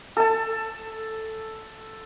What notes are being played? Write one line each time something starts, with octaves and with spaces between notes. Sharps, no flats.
A4 A5